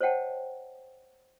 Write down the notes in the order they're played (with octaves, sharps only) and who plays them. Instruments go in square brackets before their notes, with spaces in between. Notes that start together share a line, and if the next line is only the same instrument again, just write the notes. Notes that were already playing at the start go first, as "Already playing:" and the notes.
[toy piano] C5 C#5 D#5 F#5 G5 A5